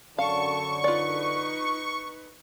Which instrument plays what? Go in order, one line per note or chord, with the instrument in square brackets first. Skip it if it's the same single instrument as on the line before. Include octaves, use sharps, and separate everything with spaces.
[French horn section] F#2 D3 [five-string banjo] F5 [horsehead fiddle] A5 [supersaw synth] C#6
[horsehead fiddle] D#4 B4 [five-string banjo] F4 D5